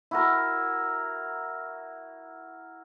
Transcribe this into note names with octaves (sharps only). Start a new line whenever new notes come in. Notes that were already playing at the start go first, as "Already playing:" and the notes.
E4 F#4 A#4